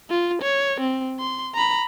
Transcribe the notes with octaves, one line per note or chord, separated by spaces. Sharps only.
F4
C#5
C4
C6
A#5 B5